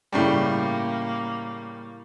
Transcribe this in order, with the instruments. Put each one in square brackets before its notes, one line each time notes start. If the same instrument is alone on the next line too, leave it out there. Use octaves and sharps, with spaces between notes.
[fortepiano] A2 C#3 G3 [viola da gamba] A#3